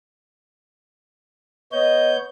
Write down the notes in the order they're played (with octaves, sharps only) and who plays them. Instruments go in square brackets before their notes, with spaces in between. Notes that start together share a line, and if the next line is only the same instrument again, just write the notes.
[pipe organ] B3 C#5 G6 [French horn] D#5